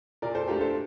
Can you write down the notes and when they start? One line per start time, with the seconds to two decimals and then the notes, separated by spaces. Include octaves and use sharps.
0.22 A#2 A#4 D5
0.35 A4 C5
0.48 A3 D4 F4 G4 A#4
0.61 A4 C5